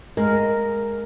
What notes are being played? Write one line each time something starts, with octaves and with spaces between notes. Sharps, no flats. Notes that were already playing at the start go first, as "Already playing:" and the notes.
G#3 A#4